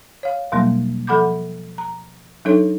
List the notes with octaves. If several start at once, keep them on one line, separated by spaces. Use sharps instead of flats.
C#5 F5
E2 B2 F#3 G3 A#3
F3 A4 F#5 B5 D6 G6
A#5
F#3 D4 D#4 A4 C#5